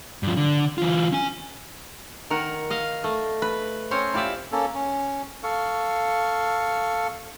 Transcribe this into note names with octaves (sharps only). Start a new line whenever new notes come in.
G2 F3
D3
E3 F4
C#4 G#5
D#3 A#4 F#5
D#5 F5
A3 D#5
B4
C4 C#4 C5 C#5
E4 F4 G4 D5 E5
A#3 C#4 A4
C#4
A4 F5 C#6